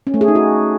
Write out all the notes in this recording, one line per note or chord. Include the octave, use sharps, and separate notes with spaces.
C#4
A3
G#4
D#4
F#4